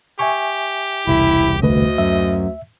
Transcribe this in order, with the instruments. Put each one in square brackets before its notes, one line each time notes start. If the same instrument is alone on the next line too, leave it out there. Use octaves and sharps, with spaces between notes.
[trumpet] G4 [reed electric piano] E5 G#5 C#6
[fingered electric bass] E1 C2 [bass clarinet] E4
[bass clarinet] D2 [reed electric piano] D3 A3 B4 [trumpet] D#5
[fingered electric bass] F#2 [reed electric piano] E5